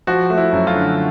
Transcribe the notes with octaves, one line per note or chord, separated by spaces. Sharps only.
F3 F#4
A3
E4
F#2
F4
D3